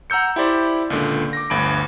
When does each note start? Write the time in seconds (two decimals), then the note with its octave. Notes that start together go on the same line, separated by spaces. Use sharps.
0.10 F#5 A#5 E6 G6 C#7
0.36 E4 G4 C5 D5
0.90 C#2 A#2 D3
1.33 D6 A#6
1.50 G1 D2 B5 D7